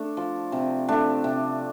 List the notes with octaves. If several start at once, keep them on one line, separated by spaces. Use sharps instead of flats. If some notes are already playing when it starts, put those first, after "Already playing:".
Already playing: A3 D4
F3
C3
A3 D4
C3